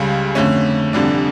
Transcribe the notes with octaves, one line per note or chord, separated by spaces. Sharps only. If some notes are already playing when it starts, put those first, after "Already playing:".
Already playing: C#2 C#3 G3
F2 D3 A3 C#4
F1 F2 D3 G3 D4